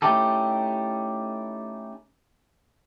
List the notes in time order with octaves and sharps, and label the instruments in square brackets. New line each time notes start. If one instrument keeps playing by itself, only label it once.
[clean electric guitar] A3 C#4 D#4 E4 G4 A4